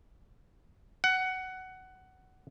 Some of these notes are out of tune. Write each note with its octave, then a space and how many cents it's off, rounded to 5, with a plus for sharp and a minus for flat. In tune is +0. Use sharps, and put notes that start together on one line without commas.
F#5 +15